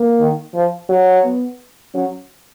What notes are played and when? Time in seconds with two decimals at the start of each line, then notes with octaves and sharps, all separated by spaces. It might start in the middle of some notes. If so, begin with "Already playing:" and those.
Already playing: A#3
0.20 D#3
0.54 F3
0.89 F#3
1.24 B3
1.94 F#3 C#4